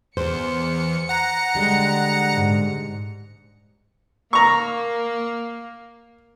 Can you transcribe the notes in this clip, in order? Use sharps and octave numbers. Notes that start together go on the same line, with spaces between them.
E2 C5 C#7
F#5 A#5
D3 G3 G#3
G#2
A#3 A#5 C#6